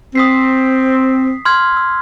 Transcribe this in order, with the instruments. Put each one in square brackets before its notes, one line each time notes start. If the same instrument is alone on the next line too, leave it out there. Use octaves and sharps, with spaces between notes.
[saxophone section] C4 [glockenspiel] D#6 B6 C7
[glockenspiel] C6 F6 G#6
E6